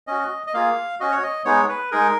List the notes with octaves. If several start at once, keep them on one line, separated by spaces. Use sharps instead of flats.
C#4 F#4 D#5
D#5
A#3 F4 G#4 F5
C#4 F#4 D#5
C#5
D#5
G#3 B3 D#4 G#4 C#5
B4
G#3 D#4 G#4 A#4